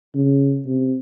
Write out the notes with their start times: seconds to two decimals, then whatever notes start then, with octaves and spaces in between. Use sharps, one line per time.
0.15 C#3
0.66 C3